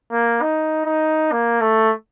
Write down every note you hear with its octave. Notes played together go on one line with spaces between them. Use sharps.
A#3
D#4
D#4
A#3
A3